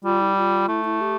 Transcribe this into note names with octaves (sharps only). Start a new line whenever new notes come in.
G3 F4
E4
F4
A3 E4
E4
G4